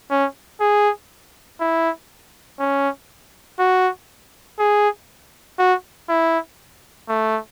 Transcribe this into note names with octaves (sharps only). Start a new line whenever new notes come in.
C#4
G#4
E4
C#4
F#4
G#4
F#4
E4
A3